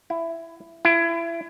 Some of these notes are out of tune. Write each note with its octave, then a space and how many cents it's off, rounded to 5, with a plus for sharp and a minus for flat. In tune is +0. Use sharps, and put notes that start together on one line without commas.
E4 +15
E4 +30